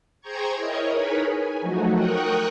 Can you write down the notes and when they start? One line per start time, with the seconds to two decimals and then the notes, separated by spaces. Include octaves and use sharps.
0.21 G#4 C5 G5 A#5 C#6 G#6
0.55 E4 A#4 C#5 D#5
0.92 D#4 G#4 A#4 B4 C#5 B5
1.29 G#5
1.61 F3 F#3 A3 D#4 F#4
1.92 A#4 G5 C#6 D#6 F#6